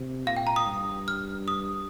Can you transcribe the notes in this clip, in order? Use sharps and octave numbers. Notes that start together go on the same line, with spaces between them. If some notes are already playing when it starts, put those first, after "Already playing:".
Already playing: C3
A#2 F5
G5
A#5
D#6
G2
F6
D#6